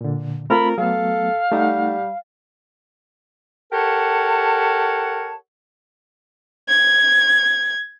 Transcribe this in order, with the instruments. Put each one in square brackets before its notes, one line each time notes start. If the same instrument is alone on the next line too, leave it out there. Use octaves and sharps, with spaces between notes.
[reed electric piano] A#2 D3
[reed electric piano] A3 C4 F4 [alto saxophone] A#4 [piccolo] B5
[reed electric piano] F#3 A3 B3 [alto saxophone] A4 [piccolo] F5
[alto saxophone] G3 [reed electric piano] A3 D#4 F#5
[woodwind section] G4 A4 A#4 C#5 F#5 A5
[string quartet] G#6